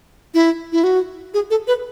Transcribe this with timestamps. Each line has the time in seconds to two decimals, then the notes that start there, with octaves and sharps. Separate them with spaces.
0.34 E4
0.72 E4
0.84 F#4
1.34 G#4
1.50 A4
1.67 B4